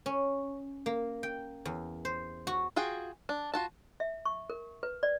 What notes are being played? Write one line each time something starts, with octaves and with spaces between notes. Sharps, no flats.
C#4
A#3
G5
E2
C5
F#4
F4 F#4 G#4 G5
D4
F4 F#4 A5
E5
C#6
A#4
B4
D5